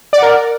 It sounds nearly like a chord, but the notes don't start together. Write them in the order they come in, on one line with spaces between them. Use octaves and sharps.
D5 F#5 A#4